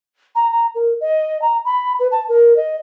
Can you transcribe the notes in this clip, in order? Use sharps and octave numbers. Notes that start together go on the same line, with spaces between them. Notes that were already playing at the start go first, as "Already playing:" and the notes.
A#5
A#5
A#4
D#5
A#5
B5
B4
A5
A#4
D#5